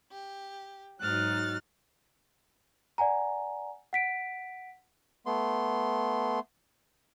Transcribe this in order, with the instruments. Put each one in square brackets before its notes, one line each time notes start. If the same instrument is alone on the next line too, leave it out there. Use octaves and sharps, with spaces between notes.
[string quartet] G4
[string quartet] G#2 A6 [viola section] F#3 D#4 [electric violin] F6 F#6
[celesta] D5 F#5 G#5 A#5
F#5 B6 D7
[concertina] A3 B3 C6